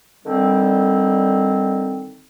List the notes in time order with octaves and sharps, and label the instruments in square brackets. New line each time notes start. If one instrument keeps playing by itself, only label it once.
[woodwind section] D3 D#3 G3 C4